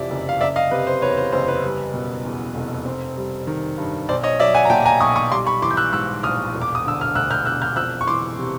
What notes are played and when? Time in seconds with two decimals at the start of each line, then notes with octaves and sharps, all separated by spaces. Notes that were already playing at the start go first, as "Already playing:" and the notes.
Already playing: F2 C3 E3 D5 E5
0.10 F#1
0.29 F5
0.41 F#1 D5 E5
0.56 D#5 F5
0.71 C3 B4
0.87 C5
1.02 E2 B4 C#5
1.17 C5
1.32 F#1 C5
1.48 B4
1.64 G3
1.94 B2
2.25 E2
2.55 F1
2.85 C4
3.17 G3
3.47 D#3
3.78 G2
4.08 B1 C5 D5
4.23 C#5 D#5
4.39 F#3 D5 E5
4.55 F#5 G#5
4.65 A#5
4.70 A#2 G5 A5
4.85 G#5 A#5
5.01 B1 C#6 D#6
5.16 C#6 D#6
5.31 G3 C6 D6
5.46 B5 C#6
5.62 E3 C6 D6
5.71 G6
5.77 E6 F#6
5.92 G#2 E6 F#6
6.23 A#1 D#6 F6
6.54 E1
6.62 D6
6.75 D#6
6.85 D3 E6
7.01 F6
7.15 D2 E6 F#6
7.31 F6 G6
7.45 E1 E6 F#6
7.62 F6 G6
7.76 F2 E6 F#6
8.01 C#6
8.07 E3 C6 D6
8.39 C3